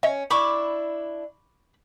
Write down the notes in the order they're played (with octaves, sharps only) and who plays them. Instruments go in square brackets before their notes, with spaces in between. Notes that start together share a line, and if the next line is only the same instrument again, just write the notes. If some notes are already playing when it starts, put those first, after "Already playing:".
[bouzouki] C#4 [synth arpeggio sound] C#5 D#5 E5
[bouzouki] D4 E4 [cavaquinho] B5 C#6 D6